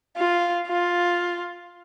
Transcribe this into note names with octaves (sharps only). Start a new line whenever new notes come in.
F4
F4